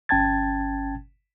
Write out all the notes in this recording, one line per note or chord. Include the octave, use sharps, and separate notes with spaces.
G1 C#4 G5 A5 G#6 A6